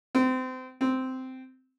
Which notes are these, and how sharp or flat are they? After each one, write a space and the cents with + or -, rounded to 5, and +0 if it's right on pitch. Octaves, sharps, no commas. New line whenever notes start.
C4 -30
C4 -10